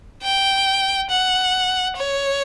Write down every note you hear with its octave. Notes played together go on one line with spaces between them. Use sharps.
G5
F#5
C#5